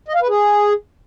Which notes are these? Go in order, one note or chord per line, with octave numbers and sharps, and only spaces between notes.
D#5
F5
B4
G#4